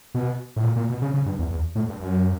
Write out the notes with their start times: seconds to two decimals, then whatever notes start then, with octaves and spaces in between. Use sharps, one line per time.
0.14 B2
0.56 A2
0.63 A#2
0.76 A#2
0.89 B2
1.02 C#3
1.14 C#3
1.26 G2
1.39 E2
1.51 E2
1.75 A2
1.89 G2
2.00 F#2